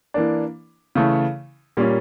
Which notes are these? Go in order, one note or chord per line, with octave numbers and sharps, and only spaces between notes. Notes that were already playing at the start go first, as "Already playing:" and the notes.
E3 A#3 D4
C#3 E3 A3
A#2 G3 A#3 C#4